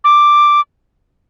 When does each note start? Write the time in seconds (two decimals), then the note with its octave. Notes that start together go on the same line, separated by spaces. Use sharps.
0.04 D6